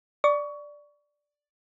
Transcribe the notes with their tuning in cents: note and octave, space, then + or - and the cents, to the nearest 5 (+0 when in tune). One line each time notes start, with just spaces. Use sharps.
D5 +0 C#6 +25